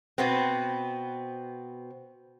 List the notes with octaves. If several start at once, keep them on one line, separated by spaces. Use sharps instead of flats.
B2 B3 C4